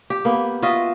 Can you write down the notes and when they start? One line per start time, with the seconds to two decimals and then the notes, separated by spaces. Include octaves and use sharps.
0.10 G4
0.25 A#3 B3
0.63 F4 F#4 D#5 E5